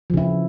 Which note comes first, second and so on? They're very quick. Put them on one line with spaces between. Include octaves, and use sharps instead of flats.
F3 C#3 E4